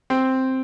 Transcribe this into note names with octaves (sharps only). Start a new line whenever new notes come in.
C4